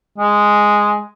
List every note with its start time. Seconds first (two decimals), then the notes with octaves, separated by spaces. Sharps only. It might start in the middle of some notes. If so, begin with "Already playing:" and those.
0.18 G#3